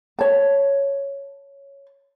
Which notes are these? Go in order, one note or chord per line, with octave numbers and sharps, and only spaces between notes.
C#5 A5